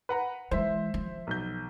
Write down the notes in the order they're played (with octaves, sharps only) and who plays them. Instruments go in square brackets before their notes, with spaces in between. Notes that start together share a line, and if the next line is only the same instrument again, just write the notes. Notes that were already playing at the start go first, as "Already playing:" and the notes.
[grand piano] B4 F#5 A#5
[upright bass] E3 G#3 [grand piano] C5 E5
[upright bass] F3
[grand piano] B1 G6